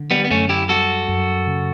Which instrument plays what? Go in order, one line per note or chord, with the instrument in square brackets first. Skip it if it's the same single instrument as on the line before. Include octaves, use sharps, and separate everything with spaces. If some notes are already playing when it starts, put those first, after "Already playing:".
Already playing: [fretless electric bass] D3
[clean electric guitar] G3 B3
B3
[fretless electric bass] F#2 [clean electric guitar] A3 C#4
[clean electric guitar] E4 G4
[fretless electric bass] G3 [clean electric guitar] F#4 A4
[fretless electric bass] F#2
C#3